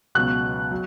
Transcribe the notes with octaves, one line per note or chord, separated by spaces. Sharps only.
C#2 B2 F#3 F#6
F#3